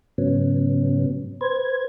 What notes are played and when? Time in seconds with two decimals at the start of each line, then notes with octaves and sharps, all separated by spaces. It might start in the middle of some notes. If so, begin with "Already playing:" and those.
0.18 G#2 C#3 F#3 B3 C#4
1.41 B4 C5 G#6